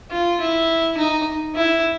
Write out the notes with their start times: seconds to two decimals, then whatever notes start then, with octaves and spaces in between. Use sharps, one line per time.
0.11 F4
0.40 E4
0.97 D#4
1.56 E4